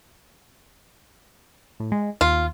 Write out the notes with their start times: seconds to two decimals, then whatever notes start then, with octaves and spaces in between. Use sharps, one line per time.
1.80 A2
1.92 G#3
2.21 D#2 F4